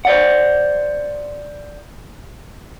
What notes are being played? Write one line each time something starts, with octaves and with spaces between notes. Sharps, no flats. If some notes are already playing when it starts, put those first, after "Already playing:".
C5 D5 F#5